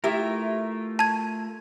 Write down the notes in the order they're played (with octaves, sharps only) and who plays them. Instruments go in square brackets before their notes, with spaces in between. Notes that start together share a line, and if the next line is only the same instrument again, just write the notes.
[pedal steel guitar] A3 F4 A#4 [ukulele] E4 G4 E5
[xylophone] A5 G#6